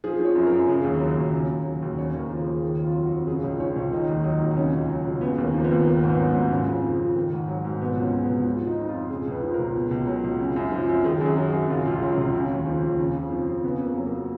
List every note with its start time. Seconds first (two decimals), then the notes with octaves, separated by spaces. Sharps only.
0.04 F3 G#4
0.20 F3 C#5
0.35 F#2
0.47 A#4
0.52 F#2
0.68 C#3 G#4
0.84 D#2
1.01 F#3
1.17 D#2
1.32 C#3
1.50 D#2
1.65 F#3
1.82 D#2
1.97 C#3 C#5
2.14 D#2
2.19 A#4
2.30 F3
2.41 G#4
2.46 D#2
2.63 D#3
2.78 F2
2.84 F4
2.94 F#3
3.05 F#4
3.11 F2
3.27 C#3 G#4
3.44 C#2 C#5
3.60 F3 C#5
3.76 C#2 C#5
3.92 D#3 D#4
4.09 D#2
4.24 F#3 D#4
4.41 D#2
4.51 D#4
4.57 C#3 C#4
4.74 C#2
4.90 F#3
5.05 C#2
5.21 C#3 B3
5.38 D#2
5.44 A#3
5.54 F3
5.60 A#3
5.64 B3
5.71 D#2
5.86 D#3 A#3
6.03 G#2
6.09 B3
6.19 F#3
6.29 C#4
6.35 G#2
6.51 C#3
6.67 F2
6.84 F3
7.00 F2
7.16 D#3
7.33 G#2
7.48 F#3
7.65 G#2
7.81 B2 B3
7.97 C#2
8.02 C#4
8.13 F#3
8.23 B3
8.30 C#2
8.46 F3
8.62 F3 D#4
8.78 F2
8.89 F4
8.94 F2
9.10 C#3 G#4
9.27 C#2 B4
9.43 F3
9.54 A#4
9.59 C#2
9.75 B2
9.91 C#2
10.07 F#3
10.24 C#2
10.40 C#3
10.56 F#2
10.72 F3
10.89 F#2
11.04 D#3 G#4
11.21 F#2
11.26 G#4
11.37 F#3
11.48 F#4
11.53 F#2
11.70 C#3 F4
11.86 C#2
11.91 F4
12.02 F#3
12.12 C#4
12.18 C#2
12.34 C#3
12.51 D#2
12.67 F3
12.83 D#2
12.99 C#3
13.16 F2
13.32 F3
13.48 F2
13.64 C#3 B3
13.80 F2
13.85 A#3
13.96 F#3
14.07 A#3